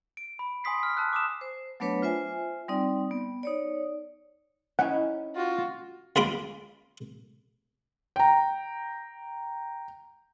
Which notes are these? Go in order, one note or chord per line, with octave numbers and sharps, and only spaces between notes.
D7
B5
G#5 C6 D#6 B6 C7
F6
A5 E6 F#6
D6 D#6 E7
C5
F#3 A3 B3 D4 B4 C#5
F4 C5 E5 G#5
G3 C4 D#4 D5
B3
D#4 C#5 D5
C#4 D#4 E4 F#5
F4 F#4
C#2 G#3 F4 B5 C6 D6
G5 A#5